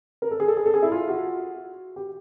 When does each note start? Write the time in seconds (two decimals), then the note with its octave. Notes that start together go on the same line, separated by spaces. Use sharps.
0.22 A#4
0.31 A4
0.40 G#4
0.48 A4
0.57 G#4
0.66 A4
0.74 G#4
0.82 E4
0.92 F4
1.09 F#4
1.96 G4